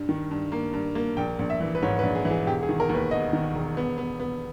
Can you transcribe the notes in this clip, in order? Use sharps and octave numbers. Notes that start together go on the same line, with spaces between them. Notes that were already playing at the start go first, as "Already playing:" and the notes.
Already playing: G2
D#3
G2
A#3
G2
A#3
A#1 G5
A#1
E5
E3
B4
G#2 C#5
B4
A#1
G#4
E3
G#4
E1 G4
G#4
D#3
A#4
D#2
B4
E1 D#5
D#3
E1
B3
B3
B3